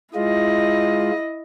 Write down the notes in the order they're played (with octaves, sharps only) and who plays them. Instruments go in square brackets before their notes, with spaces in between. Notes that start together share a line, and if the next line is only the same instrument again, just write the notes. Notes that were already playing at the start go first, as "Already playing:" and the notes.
[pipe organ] G#3 F4 [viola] E4 D#5